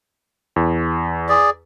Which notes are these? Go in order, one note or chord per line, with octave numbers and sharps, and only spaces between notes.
E2
G#4 D5